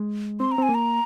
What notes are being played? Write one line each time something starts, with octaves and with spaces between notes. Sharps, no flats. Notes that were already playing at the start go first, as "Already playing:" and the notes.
Already playing: G#3
C4 C6
A#5
C4 G#5
A#3
A#5